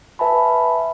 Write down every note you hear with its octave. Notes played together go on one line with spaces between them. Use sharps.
B4 E5 G#5 A5 B5